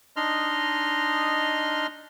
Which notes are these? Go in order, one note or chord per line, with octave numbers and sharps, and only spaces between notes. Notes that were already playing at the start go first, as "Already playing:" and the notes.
D4 D#4 D#5 C6 F6